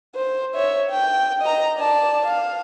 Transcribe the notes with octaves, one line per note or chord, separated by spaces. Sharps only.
C5
C#5 E5
G5
D#5 A#5
D5 A5
F5